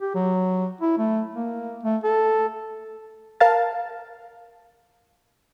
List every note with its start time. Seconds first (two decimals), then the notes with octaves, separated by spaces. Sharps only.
0.01 G4
0.15 F#3
0.81 E4
0.98 A3
1.35 A#3
1.83 A3
2.04 A4
3.40 A#4 F5 A5